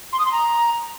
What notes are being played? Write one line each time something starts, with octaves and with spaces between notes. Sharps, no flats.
C6
D#6
C6
A#5